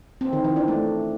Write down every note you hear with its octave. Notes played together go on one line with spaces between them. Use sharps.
C4
D#3
E3
D4
A3